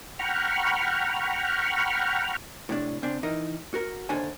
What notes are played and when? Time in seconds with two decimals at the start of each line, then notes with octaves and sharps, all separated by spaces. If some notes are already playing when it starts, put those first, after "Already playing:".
0.19 F#5 G5 A#5 B5 C#6 F6
2.69 A2 C3 D4
3.02 C#3 C4 D4
3.23 E3 D#4 A#4 D#5
3.74 F#4 A#4
4.09 D#2 D3 D4 C5 C#5 G#5